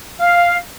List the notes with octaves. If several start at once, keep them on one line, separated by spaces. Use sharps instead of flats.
F5